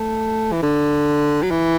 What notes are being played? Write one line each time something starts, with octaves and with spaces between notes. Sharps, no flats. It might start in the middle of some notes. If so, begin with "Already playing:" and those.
Already playing: A3
E3
D3
F#3
E3